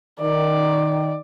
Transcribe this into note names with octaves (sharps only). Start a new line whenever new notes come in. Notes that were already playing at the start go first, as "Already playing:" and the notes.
D#3 D5